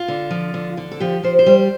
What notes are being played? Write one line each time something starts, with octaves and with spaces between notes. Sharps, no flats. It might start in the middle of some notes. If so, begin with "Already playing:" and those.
Already playing: F4
D3
F3
D3
D3
A4
F3 G4
F3 C5
C5
G3